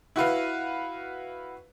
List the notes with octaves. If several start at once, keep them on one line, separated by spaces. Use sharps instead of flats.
E4 F#4 B4 F5